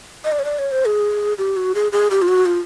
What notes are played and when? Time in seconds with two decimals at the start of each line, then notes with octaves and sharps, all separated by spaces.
0.24 D#5
0.32 D5
0.39 C#5
0.45 D5
0.59 C#5
0.72 C5
0.85 G#4
1.38 G4
1.56 F#4
1.75 G#4
1.92 G#4
2.11 G4
2.22 F4
2.28 F#4
2.46 F4